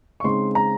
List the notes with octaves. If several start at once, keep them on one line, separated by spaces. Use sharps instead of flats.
C#6
C#3 G#3 C4 D#4 C6
A#5